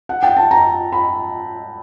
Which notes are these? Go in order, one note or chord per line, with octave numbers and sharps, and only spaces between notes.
F#5
G5
A5
A#5
B5